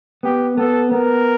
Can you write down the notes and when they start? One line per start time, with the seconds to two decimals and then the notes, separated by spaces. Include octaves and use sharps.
0.23 B3 G4
0.57 B3 A4
0.91 B3 A#4